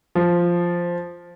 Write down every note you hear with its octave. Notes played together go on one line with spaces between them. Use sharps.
F3